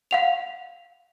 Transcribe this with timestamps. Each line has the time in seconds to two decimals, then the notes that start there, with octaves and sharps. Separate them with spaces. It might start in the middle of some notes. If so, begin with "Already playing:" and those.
0.11 F5 F#5 F7